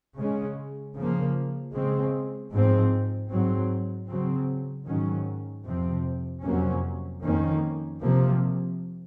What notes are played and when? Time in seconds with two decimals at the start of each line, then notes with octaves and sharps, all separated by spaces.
0.17 C#3 G#3 C#4
0.95 C#3 F3 A#3
1.74 C#3 G#3 C4
2.52 G#2 F3 C4
3.31 G#2 F#3 C4
4.09 C#3 F#3 C4
4.88 G#2 D#3 F#3 C#4
5.66 F2 C3 F3 C4
6.44 F2 C3 F#3 A#3 C#4
7.23 F2 D#3 A#3 C#4
8.01 C3 F3 A#3